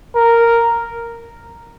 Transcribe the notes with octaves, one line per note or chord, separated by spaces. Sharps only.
A#4